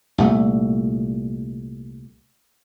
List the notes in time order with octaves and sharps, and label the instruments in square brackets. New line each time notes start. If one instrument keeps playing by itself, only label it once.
[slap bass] C2 A#2 A3